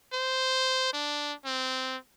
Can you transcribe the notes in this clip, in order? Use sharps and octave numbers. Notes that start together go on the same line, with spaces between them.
C5
D4
C4